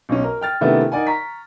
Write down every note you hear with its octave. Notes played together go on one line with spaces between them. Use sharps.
B1 C#4
A#4
G5 F6 A6
C3 D#3 A3 B3 D4 E4
D#4 A#4 D5 F#5 G#5
A#5 C#6 B6